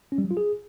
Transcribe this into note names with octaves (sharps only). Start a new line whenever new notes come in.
C#4
G3
F#3
F4
G#4